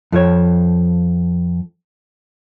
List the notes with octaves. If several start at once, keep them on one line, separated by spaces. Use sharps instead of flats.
F2 F3 C#5